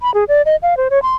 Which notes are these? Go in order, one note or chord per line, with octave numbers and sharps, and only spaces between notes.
B5
G#4
D5
D#5
F5
C5
C#5
C6